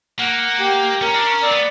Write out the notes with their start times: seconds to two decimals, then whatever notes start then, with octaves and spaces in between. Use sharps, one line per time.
0.19 A#3 F#5
0.60 G4
1.01 C#4 A#4
1.14 D4
1.27 C#4
1.42 C4 D5
1.51 B3